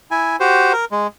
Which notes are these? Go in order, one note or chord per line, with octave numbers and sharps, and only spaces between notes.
E4 G#5
F#4 G4 C5
A#4
G#3